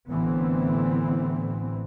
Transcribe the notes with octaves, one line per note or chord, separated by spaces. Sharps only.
A1 A2 D3 E3 B3 C4